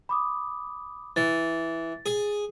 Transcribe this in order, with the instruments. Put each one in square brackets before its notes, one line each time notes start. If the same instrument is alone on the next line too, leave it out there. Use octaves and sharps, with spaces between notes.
[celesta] B5 D6 D#6
[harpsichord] E3 [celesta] A6
[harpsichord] G#4